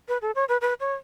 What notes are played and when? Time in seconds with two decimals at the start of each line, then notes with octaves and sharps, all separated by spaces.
0.08 B4
0.22 A4
0.35 C#5
0.49 B4
0.61 B4
0.80 C#5